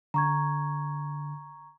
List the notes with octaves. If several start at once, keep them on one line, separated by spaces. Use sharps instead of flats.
D3 A#5 C#6 G#6